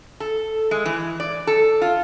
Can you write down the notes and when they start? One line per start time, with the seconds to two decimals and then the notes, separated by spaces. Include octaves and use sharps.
0.20 A4
0.71 G#3
0.85 E3
1.20 D5
1.47 A4
1.81 F4